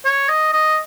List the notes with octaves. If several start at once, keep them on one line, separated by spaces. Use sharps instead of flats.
C#5
D#5
D#5